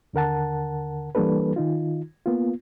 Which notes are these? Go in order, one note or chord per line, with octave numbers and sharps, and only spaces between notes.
D#2 D3 A#4 F#5 A5
E3 G3 A#3 D4 A4 B4
D#3 D#4 F4
A#3 B3 F4